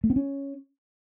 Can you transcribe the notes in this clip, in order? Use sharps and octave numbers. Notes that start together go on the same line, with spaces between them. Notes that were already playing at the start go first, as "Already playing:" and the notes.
A3
C4
C#4